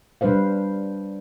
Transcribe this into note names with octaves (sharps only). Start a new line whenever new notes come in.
G3 D4 B4 C5 F5